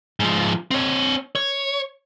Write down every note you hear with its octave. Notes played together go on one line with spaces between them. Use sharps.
G#2 F3
C4 C#5
C#5